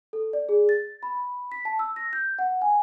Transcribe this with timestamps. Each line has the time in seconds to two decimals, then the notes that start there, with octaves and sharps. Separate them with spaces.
0.13 A4
0.33 D5
0.49 G#4
0.69 A6
1.03 B5
1.52 B6
1.65 A5
1.79 E6
1.96 A#6
2.13 G6
2.39 F#5
2.62 G#5